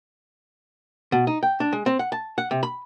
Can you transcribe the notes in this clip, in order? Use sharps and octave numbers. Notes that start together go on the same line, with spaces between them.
B2
D#4
G5
D4
G#3
C4
F#5
A5
F#5
C3
B5